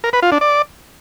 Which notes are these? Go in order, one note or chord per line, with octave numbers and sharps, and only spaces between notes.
A#4
B4
F4
D4
D5